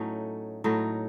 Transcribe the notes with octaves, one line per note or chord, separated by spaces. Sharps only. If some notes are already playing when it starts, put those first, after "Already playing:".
Already playing: A2 F#3 A3 C#4 D#4
A2 F#3 A3 D#4